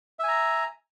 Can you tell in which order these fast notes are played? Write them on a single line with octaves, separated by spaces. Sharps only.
E5 G#5 A#5